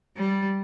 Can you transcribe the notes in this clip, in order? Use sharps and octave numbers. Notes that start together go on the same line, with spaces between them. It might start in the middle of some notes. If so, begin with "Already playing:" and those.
G3